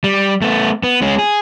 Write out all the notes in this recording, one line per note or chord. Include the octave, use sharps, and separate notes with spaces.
G3
A3 B3
B3
G#3 C#4
G#4